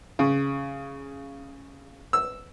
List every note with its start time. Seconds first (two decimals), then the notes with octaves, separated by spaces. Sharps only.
0.19 C#3
2.13 E6